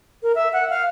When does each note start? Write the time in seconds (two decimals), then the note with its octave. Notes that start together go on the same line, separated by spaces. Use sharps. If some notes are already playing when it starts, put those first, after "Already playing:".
0.23 A#4
0.35 E5
0.53 F#5
0.70 F5